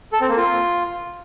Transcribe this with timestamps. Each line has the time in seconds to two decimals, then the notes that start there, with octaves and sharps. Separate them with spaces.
0.13 A4
0.21 C4
0.29 A#3
0.37 F4